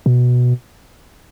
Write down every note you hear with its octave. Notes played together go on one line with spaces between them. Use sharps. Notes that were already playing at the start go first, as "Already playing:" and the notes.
B2